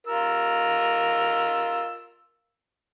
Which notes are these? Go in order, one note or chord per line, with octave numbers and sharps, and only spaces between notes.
F4 A#4 E6